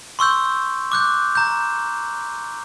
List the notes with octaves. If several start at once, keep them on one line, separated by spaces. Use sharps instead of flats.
C6 C#6 E6 G6
D6 F#6 G6
A#5 G6